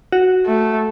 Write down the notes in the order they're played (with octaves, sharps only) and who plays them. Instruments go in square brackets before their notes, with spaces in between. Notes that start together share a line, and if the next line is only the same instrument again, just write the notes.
[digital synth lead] F#4
[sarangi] A3